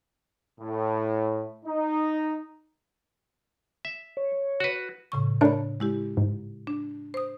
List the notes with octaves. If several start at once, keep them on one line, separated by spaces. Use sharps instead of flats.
A2
D#4
E5
C#5
F#4 B4
A2 C#3 C#6
A3 D4 A#4 C#5 B5
G#3 E4 G4
G#2
D4
C5 D#6